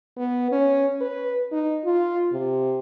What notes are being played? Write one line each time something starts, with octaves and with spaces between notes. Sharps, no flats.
B3
C#4
B4
D#4
F4
C3